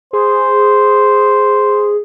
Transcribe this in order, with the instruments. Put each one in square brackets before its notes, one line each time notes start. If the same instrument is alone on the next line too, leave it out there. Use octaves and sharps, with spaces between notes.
[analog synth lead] G#4 [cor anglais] C5